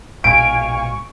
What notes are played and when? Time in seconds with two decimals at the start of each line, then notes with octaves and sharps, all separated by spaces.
0.24 A#1 G#2 B2 F5 G#5 C#6 D7